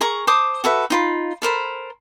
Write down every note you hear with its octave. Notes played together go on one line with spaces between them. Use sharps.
G#4 A#4 A#5 C#6
C5 A5 D6 D#6
F#4 A4 B4 E5
D#4 F4 B5
A4 A#4 C5 B5